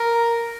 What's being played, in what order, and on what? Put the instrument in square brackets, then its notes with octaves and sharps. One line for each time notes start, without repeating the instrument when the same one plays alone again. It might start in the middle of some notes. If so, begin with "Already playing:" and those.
Already playing: [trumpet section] A#4